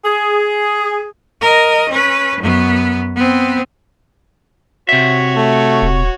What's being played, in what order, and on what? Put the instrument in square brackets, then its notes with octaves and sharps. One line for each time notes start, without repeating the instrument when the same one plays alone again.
[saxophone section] G#4
[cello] A#4 D#5
C#4 B4
F#2 B3
B3 C4
[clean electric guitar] C3 E5 [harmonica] F#4 C#5
[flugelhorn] A3
[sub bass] D#1